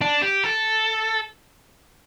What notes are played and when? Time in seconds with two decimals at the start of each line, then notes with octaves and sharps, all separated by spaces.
0.02 D4
0.22 G4
0.44 A4